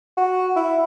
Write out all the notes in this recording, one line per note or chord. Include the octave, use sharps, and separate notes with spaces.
F#4
E4